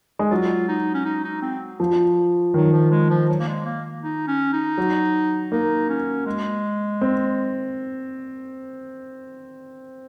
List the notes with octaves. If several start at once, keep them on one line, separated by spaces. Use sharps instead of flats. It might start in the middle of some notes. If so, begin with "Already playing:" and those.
G#3
F#3 F4
D#4
C#4
D#4
D#4
C4
F3
D#3 F#3
F3
G#3
F3
F#3
A#3
G#3
A#3
D#4
C#4
D#4
F#3
A#3 D#4
C#4
G#3
C4